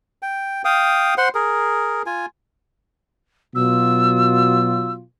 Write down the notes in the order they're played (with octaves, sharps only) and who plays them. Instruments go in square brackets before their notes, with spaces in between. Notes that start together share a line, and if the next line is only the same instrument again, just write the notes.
[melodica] G5
F5 G5 D#6
C5 F#5 C6
G#4 A#4
F4 G#5
[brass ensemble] B2 F#3 F4 [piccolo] E6